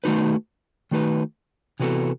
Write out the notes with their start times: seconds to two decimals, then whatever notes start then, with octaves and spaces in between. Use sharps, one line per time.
0.04 D#3 A3 D#4 F#4 B4
0.91 D#3 A3 D#4 F#4 B4
1.80 C3 E3 B3 F#4 A4